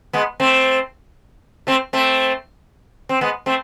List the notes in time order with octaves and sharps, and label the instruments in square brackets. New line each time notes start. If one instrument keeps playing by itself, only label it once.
[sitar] G#3 B3
A3 C4
A3 C4
A3 C4
C4
G#3 B3
A3 C4